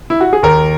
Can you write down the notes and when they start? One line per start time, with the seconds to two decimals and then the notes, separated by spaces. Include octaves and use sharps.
0.10 E4
0.21 F#4
0.33 G#4
0.43 D#2 A#4